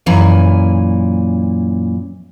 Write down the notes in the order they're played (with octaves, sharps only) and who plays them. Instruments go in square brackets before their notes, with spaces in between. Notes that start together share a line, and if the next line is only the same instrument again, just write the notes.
[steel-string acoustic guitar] F#2 A#2 E3 G#5